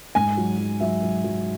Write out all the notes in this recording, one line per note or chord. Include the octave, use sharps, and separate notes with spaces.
G#2 G#5
F#3
F#3
F#3 E5
F#3
F#3